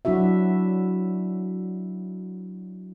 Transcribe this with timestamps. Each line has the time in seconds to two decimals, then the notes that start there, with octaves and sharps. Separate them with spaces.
0.05 F#3 D4 E4 F#4 E5